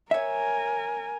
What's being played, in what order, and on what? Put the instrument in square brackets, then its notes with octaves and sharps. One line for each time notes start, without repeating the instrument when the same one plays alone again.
[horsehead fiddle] A#4 G#5 [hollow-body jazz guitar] C#5 E5